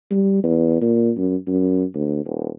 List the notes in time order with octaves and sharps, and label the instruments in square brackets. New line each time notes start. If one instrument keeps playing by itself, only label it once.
[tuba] G3
E2
A#2
F#2
F#2
D2
D#1